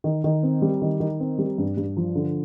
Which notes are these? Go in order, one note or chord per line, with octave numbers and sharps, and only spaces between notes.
D#3
D#3
C4
G3
D#3
D#3
C4
G3
G2
G2
F3
D3